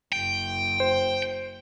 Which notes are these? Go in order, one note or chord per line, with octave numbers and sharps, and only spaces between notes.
F#1 G5
C5